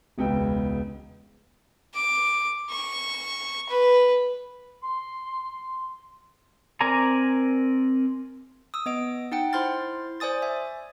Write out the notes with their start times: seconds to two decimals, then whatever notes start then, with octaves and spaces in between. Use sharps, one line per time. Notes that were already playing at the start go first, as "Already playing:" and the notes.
0.18 E1 C#2 B3 G5
1.94 D6
2.71 C#6
3.69 B4
4.81 C6
6.81 C4 A#4 D5 G#5 A#5
8.74 D#6 E6
8.86 B3 D#5 D7
9.32 D#4 F#5 G5
9.53 E4 C5 C6 F6 A6
10.20 C5 D5 G#5 D#6 A6
10.42 E5 G#5